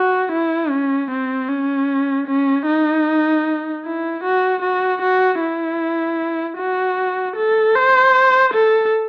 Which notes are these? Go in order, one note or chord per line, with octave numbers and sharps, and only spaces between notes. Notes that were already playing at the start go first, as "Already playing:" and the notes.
Already playing: F#4
E4
C#4
C4
C#4
C#4
D#4
E4
F#4
F#4
F#4
E4
F#4
A4
C5
A4